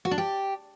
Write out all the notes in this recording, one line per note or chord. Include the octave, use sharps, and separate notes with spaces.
F#4
D4
G4